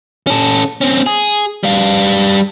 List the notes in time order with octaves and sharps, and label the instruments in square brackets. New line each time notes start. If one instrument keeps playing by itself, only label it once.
[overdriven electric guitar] C#4 A4
C4 C#4
G#4
G3 F5